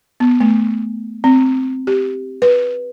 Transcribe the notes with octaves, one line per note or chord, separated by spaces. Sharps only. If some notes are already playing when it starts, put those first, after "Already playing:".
B3
A3
C4
G4
B4